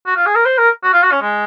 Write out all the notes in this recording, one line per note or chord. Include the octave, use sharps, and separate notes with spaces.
F#4
F4
G#4
A#4
C5
A#4
F#4
F4
F#4
C#4
G#3